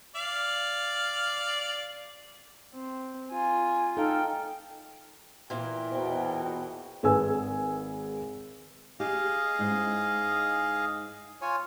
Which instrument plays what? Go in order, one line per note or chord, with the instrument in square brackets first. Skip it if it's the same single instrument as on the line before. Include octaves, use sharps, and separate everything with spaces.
[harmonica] D5 F5
[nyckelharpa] C4
[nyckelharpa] F4 [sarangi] G#5
[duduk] D#4 [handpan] A4 F5 [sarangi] G5
[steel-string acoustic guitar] A#2 E3 [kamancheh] A#4 G5
[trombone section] E2 B2 [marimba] F#4 C5
[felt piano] G#1 G#4 B4 G#5 E6
[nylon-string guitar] G4 [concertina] G#4 D#5 F5
[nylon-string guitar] G#2 C#4 E4
[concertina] F4 C#5 G#5